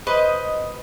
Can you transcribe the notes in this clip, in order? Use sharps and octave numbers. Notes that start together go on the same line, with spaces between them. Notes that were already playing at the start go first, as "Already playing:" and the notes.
B4 C5 D#5